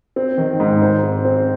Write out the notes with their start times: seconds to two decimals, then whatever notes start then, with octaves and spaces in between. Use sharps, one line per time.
0.16 C4
0.38 D#3
0.60 G#2
0.82 C5
1.03 C4
1.25 C4